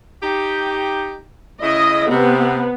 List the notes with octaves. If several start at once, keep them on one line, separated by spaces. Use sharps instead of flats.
D#4 G4
C#3 E4 D#5
C3 B3